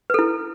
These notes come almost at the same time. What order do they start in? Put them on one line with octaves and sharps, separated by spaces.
B4 A4 E4